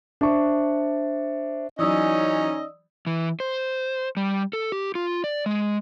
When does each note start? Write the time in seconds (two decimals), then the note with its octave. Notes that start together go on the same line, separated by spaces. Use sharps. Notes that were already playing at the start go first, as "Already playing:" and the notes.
0.21 D4 C5 E5 C#6
1.79 E3 F#3 C#4 D#4 D5 D#5 D#6 E6
3.07 E3
3.40 C5
4.17 G3
4.53 A4
4.72 G4
4.95 F4
5.24 D5
5.46 G#3